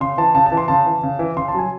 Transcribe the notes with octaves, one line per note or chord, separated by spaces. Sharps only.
C#3 C6
E3 A5
C#3 A5
A5
E3
C6
C#3 A5
E3
C#3
E3
C#3 C6
A5
F#3 G#5